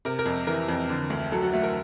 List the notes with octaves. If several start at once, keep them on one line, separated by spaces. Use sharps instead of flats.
C3 A#4
A#4
F2
E3 A#4
F2
D3
D2
F#3 A4
F#4
A3 F#4
A#4